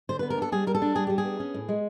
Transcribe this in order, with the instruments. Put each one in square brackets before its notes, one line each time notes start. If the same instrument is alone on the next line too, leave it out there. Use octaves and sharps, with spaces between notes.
[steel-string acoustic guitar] D3 C5
B3 B4
A#4
D4 A4
G3 G#4
G3 A#4
A4
D4
G3 G#4
G3 G4
G#4
B3
C#4
A2
G#3